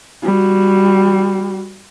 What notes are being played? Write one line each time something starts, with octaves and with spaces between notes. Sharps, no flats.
G3 F#4